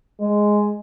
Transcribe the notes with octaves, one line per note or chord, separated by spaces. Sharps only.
G#3